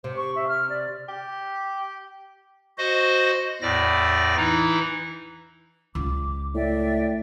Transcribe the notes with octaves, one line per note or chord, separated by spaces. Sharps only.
C3 C5
C#6
E5
F6
D5
G4
F#4 C5 D#5
E2 A2 D5 A#6
E3 D#4 E4
C#2 D6
A2 D5 E5 G5